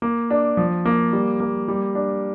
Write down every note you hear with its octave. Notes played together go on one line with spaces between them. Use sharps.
A#3
D4
F3
A#3
G3
A#3
G3
D4